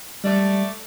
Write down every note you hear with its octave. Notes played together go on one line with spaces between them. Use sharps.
G3 A3 D5